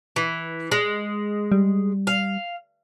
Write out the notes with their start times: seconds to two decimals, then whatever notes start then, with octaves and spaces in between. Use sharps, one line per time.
0.16 E3
0.72 G#3
1.52 G3
2.07 F5